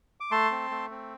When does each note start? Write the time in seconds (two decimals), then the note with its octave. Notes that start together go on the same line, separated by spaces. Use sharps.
0.20 D6
0.31 A3 A5 C6
0.51 C4
0.71 A3
0.90 C4